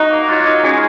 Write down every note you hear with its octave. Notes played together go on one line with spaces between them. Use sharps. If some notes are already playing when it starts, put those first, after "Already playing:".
Already playing: D#4 F#4
A#3
F#3 F4
D#4
G#3 C#4